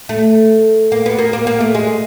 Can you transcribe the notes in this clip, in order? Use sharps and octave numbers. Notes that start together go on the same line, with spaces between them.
A3
A#3
B3
A#3
A#3
A#3
A3
G#3